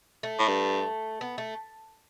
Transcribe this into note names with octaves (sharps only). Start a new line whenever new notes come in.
A3
A2
G2
B3
A3